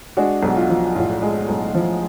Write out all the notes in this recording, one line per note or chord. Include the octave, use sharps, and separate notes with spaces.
G#3 D4 F#4
B1 F#4
F4
F3
A2 F4
G#3
B1
F3